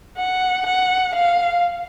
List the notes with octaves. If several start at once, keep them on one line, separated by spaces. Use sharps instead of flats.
F#5
F#5
F5